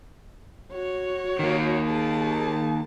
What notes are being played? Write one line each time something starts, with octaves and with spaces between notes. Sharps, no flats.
F#4 C#5
D#3 A#3
G#4 A5